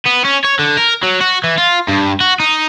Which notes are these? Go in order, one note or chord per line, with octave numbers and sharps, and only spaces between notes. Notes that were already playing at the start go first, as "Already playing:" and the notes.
B3
C#4
C#5
D3
A#4
F#3
F#4
E3
F4
G2
F#4
D#4